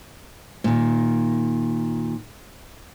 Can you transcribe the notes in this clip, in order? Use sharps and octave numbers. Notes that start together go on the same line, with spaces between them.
A#2 D#3